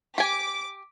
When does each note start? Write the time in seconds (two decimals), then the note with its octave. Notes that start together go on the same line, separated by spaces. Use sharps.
0.18 G4 G#5 D6